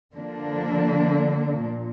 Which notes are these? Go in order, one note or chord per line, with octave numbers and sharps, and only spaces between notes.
D3 F3 A#3 D4
A#2